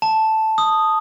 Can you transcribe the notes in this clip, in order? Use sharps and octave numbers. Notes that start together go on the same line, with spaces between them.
A5
D#6